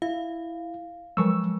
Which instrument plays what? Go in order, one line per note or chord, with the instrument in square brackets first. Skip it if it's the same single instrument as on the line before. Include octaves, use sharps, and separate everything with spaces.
[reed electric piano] E4 [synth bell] F5
[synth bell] F3 F#3 G#3 [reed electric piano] C#6 E6